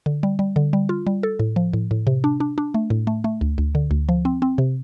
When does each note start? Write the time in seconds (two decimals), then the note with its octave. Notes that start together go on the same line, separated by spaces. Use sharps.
0.06 D3
0.23 G3
0.39 G3
0.56 D3
0.73 G3
0.89 F4
1.07 G3
1.23 A4
1.39 A2
1.56 F3
1.73 A2
1.91 A2
2.07 C3
2.24 D4
2.40 D4
2.58 D4
2.74 A3
2.90 A2
3.07 A3
3.24 A3
3.41 D2
3.58 D2
3.75 D3
3.91 D2
4.09 F3
4.25 C4
4.42 C4
4.58 C3